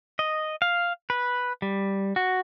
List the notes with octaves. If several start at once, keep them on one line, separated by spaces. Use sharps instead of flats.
D#5
F5
B4
G3
F#4